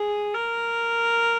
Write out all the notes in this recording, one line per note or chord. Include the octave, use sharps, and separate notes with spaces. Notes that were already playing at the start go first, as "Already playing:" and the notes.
Already playing: G#4
A#4